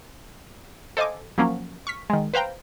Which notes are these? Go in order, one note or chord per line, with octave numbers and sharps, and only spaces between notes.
A4 C5 D#5 F5 G#5 D6
F3 F#3 A#3 C#4
C#6 F6 B6
D#3 G#3
B4 C5 F5 G5 A#5